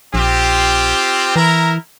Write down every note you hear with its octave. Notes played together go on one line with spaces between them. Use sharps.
A#1 C4 F4 G4
E3 E4 A#4 A#5